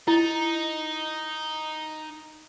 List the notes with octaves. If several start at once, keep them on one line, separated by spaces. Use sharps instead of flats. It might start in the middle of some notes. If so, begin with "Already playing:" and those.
D#4 E4